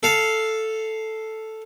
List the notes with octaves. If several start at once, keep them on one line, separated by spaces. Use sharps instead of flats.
A4 F5